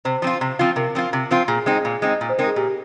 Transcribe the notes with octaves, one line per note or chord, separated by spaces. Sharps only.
C3 C5
F3 C4 F4
C3
F3 C4 F4
C3 A#4
F3 C4 F4
C3
F3 C4 F4
A#2 G#4
G#3 C4 D#4 G#4
A#2
G#3 C4 D#4
A#2
C5
G#3 C4 D#4 A#4
G#4
A#2 G4